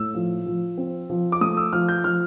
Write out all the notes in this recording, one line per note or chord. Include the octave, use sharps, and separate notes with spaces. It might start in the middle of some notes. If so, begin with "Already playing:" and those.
Already playing: A2 E6
F3
F3
C4
F3
D6
A3 D#6
E6
F3 F6
G6
F3 F6